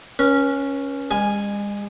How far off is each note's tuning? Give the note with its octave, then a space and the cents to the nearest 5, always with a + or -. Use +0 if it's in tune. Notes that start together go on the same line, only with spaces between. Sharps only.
C#4 +0 B4 -40
G#3 -40 G#5 +0